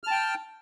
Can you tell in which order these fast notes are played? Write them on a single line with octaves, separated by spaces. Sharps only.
F6 A5 G5